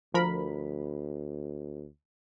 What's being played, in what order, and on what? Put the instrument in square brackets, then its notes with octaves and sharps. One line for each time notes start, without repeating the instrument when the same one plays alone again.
[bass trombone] D2 [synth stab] F3 A#4 B5